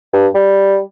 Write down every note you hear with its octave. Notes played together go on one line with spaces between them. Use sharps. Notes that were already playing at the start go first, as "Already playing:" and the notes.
G2
G3